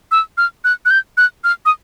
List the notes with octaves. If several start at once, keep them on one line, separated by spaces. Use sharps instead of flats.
E6
F6
F#6
F#6
G6
F#6
F6
D#6